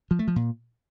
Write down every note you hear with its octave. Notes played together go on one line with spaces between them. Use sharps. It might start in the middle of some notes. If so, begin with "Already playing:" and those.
F3
A3
F3
A#2